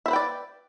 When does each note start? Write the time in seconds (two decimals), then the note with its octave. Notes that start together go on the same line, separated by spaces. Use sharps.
0.06 E5
0.08 C5
0.11 B4
0.13 G5
0.16 D5